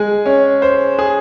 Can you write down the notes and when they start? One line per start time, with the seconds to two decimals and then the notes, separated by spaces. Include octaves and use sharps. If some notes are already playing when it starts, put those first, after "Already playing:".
Already playing: G#3 G#4
0.26 C#4
0.62 C5
0.99 G#4